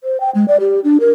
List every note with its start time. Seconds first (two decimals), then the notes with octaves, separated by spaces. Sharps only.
0.04 C5
0.20 G5
0.35 G#3
0.48 D5
0.60 G4
0.84 D4
1.00 A#4